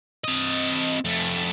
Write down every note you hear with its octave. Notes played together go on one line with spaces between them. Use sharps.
C4 D#5
F2 A3